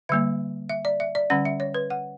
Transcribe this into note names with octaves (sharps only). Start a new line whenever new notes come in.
D3 G3 A#3 E5
E5
D5
E5
D5
D3 G3 C#4 F#5
E5
C#5
B4
F#5